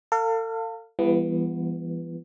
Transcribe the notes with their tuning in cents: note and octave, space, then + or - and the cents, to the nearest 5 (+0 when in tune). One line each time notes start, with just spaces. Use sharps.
A4 +40 F5 +0
E3 +40 G3 +45 B3 +0